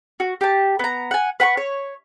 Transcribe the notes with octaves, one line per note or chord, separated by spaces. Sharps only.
F#4
G4 A5
B3 A#5
F#5 G#5
B4 F#5 G#5 C#6
C#5